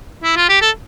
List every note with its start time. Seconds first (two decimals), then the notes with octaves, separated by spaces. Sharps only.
0.24 E4
0.36 F4
0.49 G4
0.61 A4